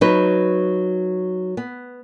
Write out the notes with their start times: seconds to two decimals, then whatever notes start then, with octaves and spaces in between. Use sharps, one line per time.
0.01 F#3 D#4 B4
1.57 B3